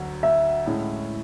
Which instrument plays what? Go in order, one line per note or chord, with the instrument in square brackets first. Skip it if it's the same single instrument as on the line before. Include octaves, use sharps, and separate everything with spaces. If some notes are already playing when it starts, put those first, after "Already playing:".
Already playing: [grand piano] D2 F#3
[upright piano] E5
[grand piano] A2 G#3 C#4 E4